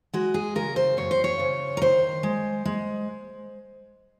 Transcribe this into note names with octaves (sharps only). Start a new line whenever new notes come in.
G#3 F#4
G#4
C#3 A#4
C5
F#2 C#5
C5
C#5
C#3
A#4
D#3 C5
G#3
G#3